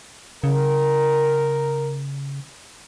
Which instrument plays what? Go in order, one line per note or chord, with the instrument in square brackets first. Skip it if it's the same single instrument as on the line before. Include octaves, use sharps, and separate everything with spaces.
[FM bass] C#3 [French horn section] A#4